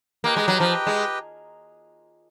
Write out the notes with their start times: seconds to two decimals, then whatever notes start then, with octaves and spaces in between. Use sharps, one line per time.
0.24 A#3 G4 B4 D#5 G5
0.37 G#3
0.48 F#3
0.60 F3
0.87 G#3